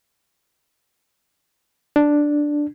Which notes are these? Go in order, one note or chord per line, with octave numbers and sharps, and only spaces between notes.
D4